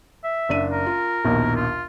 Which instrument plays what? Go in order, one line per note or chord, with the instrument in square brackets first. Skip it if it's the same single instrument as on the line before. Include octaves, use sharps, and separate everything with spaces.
[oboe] E5
[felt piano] F#1 D4 D#7
[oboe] A#4
[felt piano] F4
A#1 D#2 B2
[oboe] F4